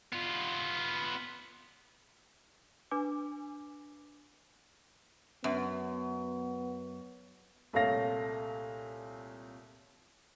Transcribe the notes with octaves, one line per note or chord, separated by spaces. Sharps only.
B3 F4
D4 B4 G#5 D6
F#2 B3
C2 A#2 A3 C#5 F5 A#6